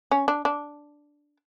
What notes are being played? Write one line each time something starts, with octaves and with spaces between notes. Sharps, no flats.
C#4
D4
D4